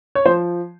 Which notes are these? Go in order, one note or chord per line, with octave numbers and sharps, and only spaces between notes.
C#5
F3 C5